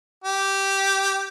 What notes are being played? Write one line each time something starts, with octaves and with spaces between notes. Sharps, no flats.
G4